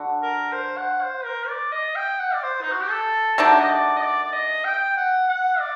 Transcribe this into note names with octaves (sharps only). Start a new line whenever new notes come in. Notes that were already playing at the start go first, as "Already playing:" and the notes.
Already playing: D3 F#4
A#4
C5
F#5
C5
A#4
D5
D#5
G5
F#5
D5
C5
D#4
F#4
G4
A4
D#3 A3 D4 F#4 G4
D#5
D5
D#5
D5
D5
D#5
G5
F#5
F#5
D5